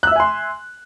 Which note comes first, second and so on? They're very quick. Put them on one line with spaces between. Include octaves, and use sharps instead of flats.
F#6 E6 E5 G#5 C6